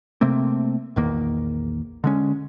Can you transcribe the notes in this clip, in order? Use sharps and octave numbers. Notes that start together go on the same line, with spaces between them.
C3 A3 A#3 C4
A#1 E2 D#3 A#3
D3 G#3 C#4